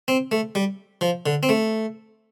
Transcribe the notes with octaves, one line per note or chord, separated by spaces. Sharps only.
C4
A3
G3
F3
D3
C4
A3